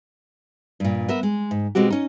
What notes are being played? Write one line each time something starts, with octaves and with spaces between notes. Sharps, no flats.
G2 A#2
B3 A#4 E5
G#3
G#2
B2 G#3 C4 F#4 G4
C#4 D#4